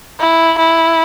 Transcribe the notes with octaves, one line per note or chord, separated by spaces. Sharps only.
E4
E4